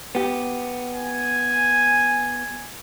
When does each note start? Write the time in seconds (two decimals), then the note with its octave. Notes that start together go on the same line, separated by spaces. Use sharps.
0.15 B3 G4
0.93 G#5